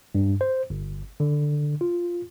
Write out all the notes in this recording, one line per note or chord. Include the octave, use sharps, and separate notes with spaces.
G2
C5
G1
D3
F4